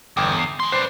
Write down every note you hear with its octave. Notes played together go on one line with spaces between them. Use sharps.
G1 E2 G5 D6
C7
B3 C6
B4 C5 D5 C7